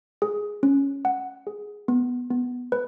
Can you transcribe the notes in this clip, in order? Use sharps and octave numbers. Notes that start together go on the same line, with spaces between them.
G#4
C#4
F#5
G#4
B3
B3
B4